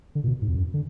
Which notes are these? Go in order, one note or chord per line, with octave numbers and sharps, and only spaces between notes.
D3
A#2
B2
G#2
F2
F#2
D3